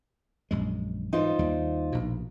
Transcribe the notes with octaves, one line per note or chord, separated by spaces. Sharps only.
A#1 F#2 G#3
G#2 E3 D#4 F4 C5
D#2 G3
A#1 B2